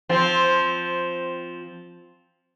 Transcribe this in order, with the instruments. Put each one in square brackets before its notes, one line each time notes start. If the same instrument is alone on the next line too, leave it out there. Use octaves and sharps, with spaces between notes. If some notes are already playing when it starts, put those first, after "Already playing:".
[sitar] F3 C4